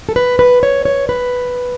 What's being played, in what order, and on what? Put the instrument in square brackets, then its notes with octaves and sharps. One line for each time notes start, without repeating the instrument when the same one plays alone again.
[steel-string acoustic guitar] A4
B4
B4
C#5
C#5
B4